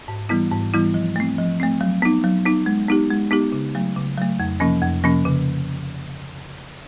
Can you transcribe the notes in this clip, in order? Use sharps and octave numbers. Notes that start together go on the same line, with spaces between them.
G#2
E3 G3 B3 E4
G#2
E3 G3 B3 E4
F3
A3 C4
F3
A3 C4
F#3
B3 D#4
F#3
B3 D#4
G#3
B3 D#4 G4
G#3
B3 D#4 G4
C#3
F#3 A3
C#3
F#3 A3
F2
C3 F3 A#3 C#4
F2
C3 F3 A#3 C#4
C#3